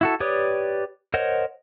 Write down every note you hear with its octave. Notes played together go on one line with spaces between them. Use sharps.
E4 F#4 A4
G4 B4 C#5 D5 D#6
A#4 C5 C#5 D#5 F#5